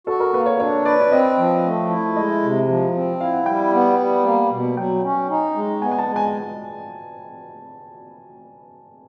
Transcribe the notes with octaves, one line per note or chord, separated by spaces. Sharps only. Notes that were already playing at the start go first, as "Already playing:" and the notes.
F#4 A4
A#4
A#3 B4
C#5
D4 C#5
B4 D5
D5
C4 D#5
F3
A3
E4
G#3 D#5
C3
F3
C4
E4 F5
F#5
G3 G5
B3
G3
A#3
B2
F#3 G5
C#4
D#4
G#3
B3 G#5
G#5
A5
G#3
G#5